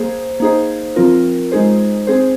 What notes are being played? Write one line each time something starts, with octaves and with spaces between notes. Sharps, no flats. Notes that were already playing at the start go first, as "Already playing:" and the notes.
Already playing: A#3 G#4 C5
A#3 D#4 G#4 C5
F3 C4 F4 A#4
G#3 D#4 G#4 C5
C4 G#4 C5